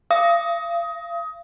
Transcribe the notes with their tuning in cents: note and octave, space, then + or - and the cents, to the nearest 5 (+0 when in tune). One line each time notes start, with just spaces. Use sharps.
F5 -35 D#6 +25